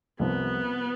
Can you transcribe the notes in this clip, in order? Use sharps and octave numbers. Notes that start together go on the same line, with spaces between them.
C2 C3 F3 B3